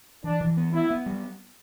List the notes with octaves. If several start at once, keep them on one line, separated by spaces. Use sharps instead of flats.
E3 D4
E3
B3
B3 E4
B3
G3